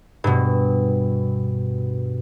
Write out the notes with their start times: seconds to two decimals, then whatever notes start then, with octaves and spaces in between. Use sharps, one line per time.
0.24 G2 B2